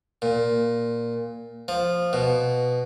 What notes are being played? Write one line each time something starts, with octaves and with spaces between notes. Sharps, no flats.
A#2
F3
B2